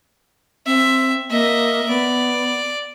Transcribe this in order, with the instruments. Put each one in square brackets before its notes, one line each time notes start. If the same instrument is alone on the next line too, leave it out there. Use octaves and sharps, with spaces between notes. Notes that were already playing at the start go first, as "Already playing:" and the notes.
[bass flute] C4 [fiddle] E5
[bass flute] A#3 [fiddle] D#5 E5
[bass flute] B3 [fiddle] D5